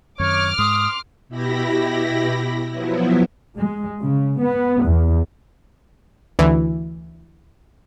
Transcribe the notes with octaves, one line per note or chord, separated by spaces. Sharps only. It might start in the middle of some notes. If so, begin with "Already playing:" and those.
F#2 D#3 C4 C#5 D6 F6
G#2 G#3 C6 D#6
B2 E4 G4 B5 A#6
F3 F#3 B3 E4
G#3
C#3
B3
E2
D2 E3